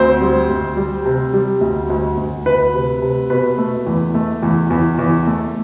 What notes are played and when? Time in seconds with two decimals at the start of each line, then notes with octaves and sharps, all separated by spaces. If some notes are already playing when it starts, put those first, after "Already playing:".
Already playing: D2 C4 C5
0.21 G3
0.49 D2
0.77 G3
1.06 C3
1.33 G3
1.61 D2
1.90 D2
2.18 D2
2.46 D2 B4
2.74 C3
3.02 C3
3.30 B2 B4
3.58 A3
3.86 E2
4.14 A3
4.43 E2
4.70 E2
4.99 E2
5.27 A3